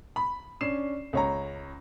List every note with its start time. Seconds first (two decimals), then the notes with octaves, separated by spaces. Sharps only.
0.16 B5
0.61 C#4 D4 C7 E7
1.13 C#2 C#5 A#5